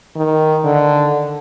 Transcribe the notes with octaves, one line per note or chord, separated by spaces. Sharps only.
D#3
D3